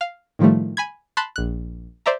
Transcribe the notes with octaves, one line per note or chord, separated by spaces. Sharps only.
F5
A2 D#3 F3 G3 A3
G#5 B5 G#6
A5 B5 C6 F#6
A#1 F#6
C5 D5 E5 A#5